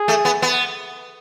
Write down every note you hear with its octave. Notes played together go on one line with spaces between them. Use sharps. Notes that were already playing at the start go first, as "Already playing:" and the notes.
Already playing: G#4
A3
B3
B3